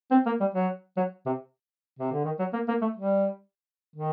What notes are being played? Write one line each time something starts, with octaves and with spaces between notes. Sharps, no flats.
C4
A#3
G3
F#3
F#3
C3
C3
D3
D#3
F#3
A#3
A#3
A3
G3
D#3